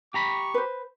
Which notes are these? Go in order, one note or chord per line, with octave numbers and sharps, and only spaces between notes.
G4 A#5 B5 C#6
B4 C5